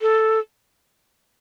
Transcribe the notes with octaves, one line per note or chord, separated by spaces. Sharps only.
A4